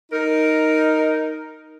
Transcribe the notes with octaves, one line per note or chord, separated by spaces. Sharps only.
D#4 A#4